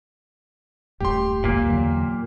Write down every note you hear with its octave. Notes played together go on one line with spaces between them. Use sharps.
D#1 F#2 A3 G4 C6
G1 C#2 F#2 A#2 A#3
E2 D3 F#3